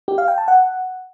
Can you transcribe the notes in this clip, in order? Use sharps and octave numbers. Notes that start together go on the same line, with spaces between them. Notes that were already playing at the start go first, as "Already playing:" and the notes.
G4
F5
G5
A5
F#5